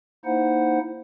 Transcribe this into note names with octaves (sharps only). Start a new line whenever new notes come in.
A#3 D#4 E4 C5 F#5